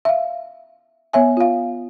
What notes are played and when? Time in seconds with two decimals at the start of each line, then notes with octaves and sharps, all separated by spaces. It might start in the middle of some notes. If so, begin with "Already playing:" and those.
0.05 E5 F5
1.13 B3 C#5 E5 G#5
1.37 F4 F5